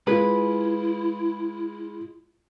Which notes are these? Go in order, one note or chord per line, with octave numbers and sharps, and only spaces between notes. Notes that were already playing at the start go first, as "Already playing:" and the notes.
G#3 E4 F4 B4